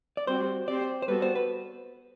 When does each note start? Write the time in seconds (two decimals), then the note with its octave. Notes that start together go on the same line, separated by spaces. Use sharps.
0.17 D5
0.27 G3 C4 F#4 C5
0.68 C4 G4 C5 D5
1.02 C5
1.08 G3 B3 F#4 A4 B4
1.22 C5
1.35 B4